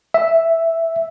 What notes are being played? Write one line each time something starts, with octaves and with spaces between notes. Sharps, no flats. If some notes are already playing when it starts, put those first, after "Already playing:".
E5